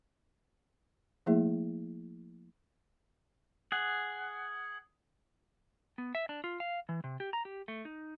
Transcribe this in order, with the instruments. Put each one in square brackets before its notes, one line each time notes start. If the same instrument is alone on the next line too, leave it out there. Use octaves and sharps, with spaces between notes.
[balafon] F3 A3 A#3 E4 G#4 E5
[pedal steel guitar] G#4 F#5
[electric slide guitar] B3
E5
D4
F4
F5
E3
C3
G4
A#5
G4
A3
D#4